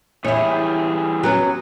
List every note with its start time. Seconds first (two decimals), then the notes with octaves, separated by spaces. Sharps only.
0.24 E3 G3 E4 G#4 C#5
1.23 F#3 B3 C#4